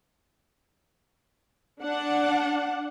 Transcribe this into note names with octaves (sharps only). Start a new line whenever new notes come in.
D4 F#5